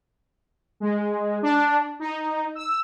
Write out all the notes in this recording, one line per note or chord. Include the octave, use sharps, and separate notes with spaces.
G#3
D4
D#4
E6